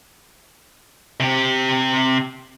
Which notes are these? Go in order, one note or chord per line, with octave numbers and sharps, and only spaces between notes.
C3 G4